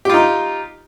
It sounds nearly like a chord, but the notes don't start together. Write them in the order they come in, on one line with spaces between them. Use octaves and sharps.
G4 F4 D#4